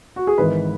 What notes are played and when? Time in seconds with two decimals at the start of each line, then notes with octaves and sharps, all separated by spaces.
0.16 F#4
0.27 G#4
0.38 G#1 G#2 E3 B4